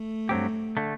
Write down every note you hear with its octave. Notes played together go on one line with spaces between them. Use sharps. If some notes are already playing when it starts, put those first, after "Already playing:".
Already playing: A3
G2 F#3 C4 G4
D3 A3